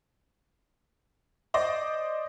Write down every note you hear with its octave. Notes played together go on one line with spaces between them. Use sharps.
C5 D5 D#5